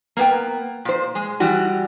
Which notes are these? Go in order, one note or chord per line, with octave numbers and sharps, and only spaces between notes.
A#3 B3 G5
A#2 C5
G#3
E3 G3 F#4